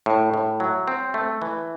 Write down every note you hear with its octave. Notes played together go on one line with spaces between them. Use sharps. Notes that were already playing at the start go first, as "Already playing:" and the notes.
A2
A2
F#3
C4
A3
E3